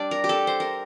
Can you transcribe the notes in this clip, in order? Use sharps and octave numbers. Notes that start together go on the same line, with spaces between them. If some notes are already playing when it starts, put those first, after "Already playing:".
Already playing: G3 D4 D5
A#4
G4
A4
C5
A#4